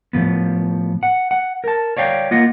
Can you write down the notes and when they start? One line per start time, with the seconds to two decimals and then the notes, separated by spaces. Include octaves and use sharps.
0.13 A2 F3 B3
1.03 F#5
1.31 F#5
1.64 A#4 A5
1.97 C#5 D5 F5 G5
2.31 A#3 F4 D#5 F#5